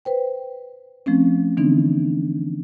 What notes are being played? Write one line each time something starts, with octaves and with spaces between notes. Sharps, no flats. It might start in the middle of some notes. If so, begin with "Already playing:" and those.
B4 C5 G5
F3 A3 C4 C#4
D3 E3 B3 C4 D4 D#4